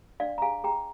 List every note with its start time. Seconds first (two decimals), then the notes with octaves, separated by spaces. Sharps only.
0.20 D4 D5 F5
0.38 A#5
0.42 G#4 F5 G#5
0.64 G#4 G5 A#5